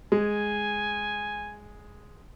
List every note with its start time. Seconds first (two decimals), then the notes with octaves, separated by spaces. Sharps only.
0.12 G#3 G#5